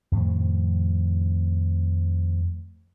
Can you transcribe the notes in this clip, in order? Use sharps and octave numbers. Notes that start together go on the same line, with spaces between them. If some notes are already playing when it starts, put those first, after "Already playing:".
F2 A2 D#3 F3